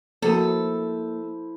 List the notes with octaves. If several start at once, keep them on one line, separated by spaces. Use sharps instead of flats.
F3 A3 A#3 E4 F#4 A4 C5